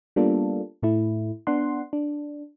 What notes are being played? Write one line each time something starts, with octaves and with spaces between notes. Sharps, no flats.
G3 A#3 B3 D4 F4 A4
A2 A3 E4
B3 D4 F#5 C6
D4